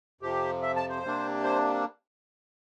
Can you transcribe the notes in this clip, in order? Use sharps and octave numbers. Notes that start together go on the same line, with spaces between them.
F2 C3 F3 G4
E5
A5
C5
C3 G3 A#3 D4
C5